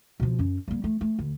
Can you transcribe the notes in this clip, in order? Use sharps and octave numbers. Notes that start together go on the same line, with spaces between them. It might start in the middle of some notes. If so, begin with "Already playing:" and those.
B2 F3
F#2 C#4
G3 A#3
A3
A3
D2